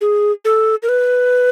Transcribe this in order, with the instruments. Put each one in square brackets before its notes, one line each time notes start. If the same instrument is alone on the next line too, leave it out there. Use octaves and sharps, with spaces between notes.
[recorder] G#4
A4
A#4
B4